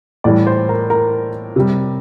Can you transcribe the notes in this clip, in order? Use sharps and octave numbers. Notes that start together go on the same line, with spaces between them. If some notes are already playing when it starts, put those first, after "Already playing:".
A2 E3 G3 D5
C5
A#4
A#4
C3 G3